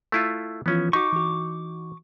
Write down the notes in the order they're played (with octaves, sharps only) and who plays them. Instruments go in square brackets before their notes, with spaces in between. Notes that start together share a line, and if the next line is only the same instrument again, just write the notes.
[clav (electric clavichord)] A3 E4 F4
[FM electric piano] E3 F3 F4 [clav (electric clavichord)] B3 C#4
[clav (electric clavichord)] D#4 [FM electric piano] F#4 B6 [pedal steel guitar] C#6 D6
[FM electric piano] E3 F#4